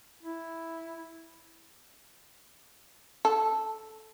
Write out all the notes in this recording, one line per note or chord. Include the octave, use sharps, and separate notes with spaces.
E4
A4